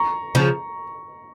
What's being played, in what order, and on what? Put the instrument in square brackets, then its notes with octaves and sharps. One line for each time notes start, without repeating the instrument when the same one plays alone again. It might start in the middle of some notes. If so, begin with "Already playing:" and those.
Already playing: [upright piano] A#5 C#6
[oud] C#3 F3